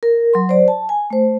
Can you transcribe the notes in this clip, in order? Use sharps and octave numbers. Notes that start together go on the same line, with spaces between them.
A#4
F#3 C6
C5 D5
A5
G#5
A3 C5